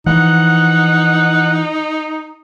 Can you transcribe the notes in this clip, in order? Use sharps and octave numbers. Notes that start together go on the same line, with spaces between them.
E3 F3 D#4 F#5